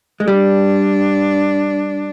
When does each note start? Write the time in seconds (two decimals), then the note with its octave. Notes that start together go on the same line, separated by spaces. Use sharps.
0.20 G#3
0.27 G3 D4